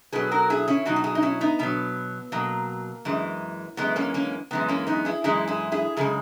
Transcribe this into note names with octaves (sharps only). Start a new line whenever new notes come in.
B2 F#3 G#4 B4
F#4 A#4
E4 G#4
C#4 E4
B2 F#3 D#4 F#4
F#4
E4 G#4
D#4
C#4 E4
B3 D#4
B2 F#3 B3
B2 F#3 A#3
F#2 E3 G#3
F#2 E3 G#3 B3
A#3 C#4
A#3 C#4
F#2 E3 G#3 B3
A#3 C#4
B3 D#4
E4 G#4
F#2 E3 G#3 E4 G#4
E4 G#4
E4 G#4
F#2 C#3 G#3 G#4